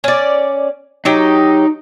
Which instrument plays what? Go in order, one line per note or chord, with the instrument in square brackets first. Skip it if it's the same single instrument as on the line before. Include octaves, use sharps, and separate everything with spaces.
[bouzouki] C#4 D5
[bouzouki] F#3 G4 [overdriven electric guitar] D#4